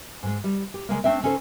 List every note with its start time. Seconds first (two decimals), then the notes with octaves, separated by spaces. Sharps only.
0.23 G#2 G#3
0.44 G3
0.74 G4
0.89 C#3 F3 G#3 A#3
1.04 A3 A#3 C4 D4 E5
1.23 C#3 C#4 D#4 A4 C5